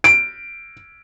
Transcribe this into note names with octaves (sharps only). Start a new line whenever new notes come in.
D7